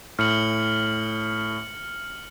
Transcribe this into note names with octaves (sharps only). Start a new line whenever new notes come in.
A2 F6 C#7 F#7